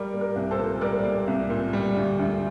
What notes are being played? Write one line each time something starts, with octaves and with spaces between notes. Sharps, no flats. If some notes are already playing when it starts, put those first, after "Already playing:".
Already playing: G3 A#4 D5
A#3
A#4
C2
A4 C5
A#2
G3 A#4 D5
A#3
C2
A#2
G3
D2
D2